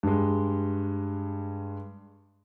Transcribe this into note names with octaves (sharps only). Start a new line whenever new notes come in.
G2 G#3